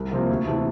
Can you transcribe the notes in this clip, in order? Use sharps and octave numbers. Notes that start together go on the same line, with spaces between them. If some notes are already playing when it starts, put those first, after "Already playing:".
Already playing: C2
C3 F3 A#3
D2
C3 E3 A3